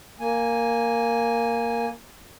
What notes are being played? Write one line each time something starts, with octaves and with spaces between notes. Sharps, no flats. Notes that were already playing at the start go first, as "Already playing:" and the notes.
A#3 G#5